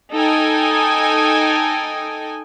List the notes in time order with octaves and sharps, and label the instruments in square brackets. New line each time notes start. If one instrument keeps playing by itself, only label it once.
[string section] D#4 A4 G5 G#5